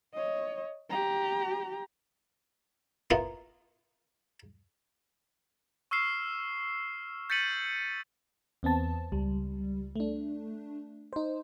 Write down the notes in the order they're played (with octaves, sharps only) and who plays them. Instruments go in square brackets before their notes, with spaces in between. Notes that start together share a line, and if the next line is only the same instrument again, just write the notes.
[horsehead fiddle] C#5 D#5
G4 A#5
[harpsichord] A#3 B3 E4 F4 A#4
[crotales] C#6 E6 F6 C7 E7
G6 A6 B6 C#7 D#7 F#7
[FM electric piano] E2 B3 C4 A5
C#2 G3
A3 D4
D#4 C5